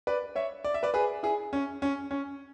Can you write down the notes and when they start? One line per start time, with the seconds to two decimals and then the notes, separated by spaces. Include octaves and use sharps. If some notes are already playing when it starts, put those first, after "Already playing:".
0.07 B4 D5
0.36 C#5 E5
0.64 D5
0.74 E5
0.83 B4 D5
0.94 G#4 B4
1.23 E4 G#4
1.53 C#4
1.82 C#4
2.11 C#4